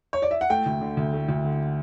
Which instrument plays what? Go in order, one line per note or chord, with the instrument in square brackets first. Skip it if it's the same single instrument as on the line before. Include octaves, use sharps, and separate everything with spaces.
[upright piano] C#5
D5
E5
F#5
A3 G5
D2
D3
D2
A3
D2
D3